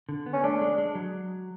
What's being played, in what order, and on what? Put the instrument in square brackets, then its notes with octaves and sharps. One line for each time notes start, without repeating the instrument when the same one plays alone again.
[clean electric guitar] D3
B3
[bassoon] C#4
[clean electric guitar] A3 [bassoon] D4
[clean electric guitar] G#3
G#3
F#3